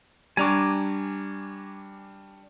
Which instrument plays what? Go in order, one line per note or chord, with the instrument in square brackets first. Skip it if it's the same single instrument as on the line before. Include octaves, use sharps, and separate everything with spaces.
[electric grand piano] G3 D4 C#6 [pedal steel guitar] G#5 A#5 D6